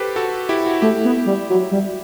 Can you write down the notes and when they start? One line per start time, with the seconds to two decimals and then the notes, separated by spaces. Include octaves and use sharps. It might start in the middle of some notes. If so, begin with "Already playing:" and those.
Already playing: G4 A4 B4 C5
0.16 F#4 A4
0.49 E4 G4
0.66 F#4
0.82 A3 E4 G4
1.05 B3
1.26 G3
1.49 F#3
1.71 G3